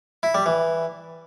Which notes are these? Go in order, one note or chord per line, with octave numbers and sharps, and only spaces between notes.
E4
G3
E3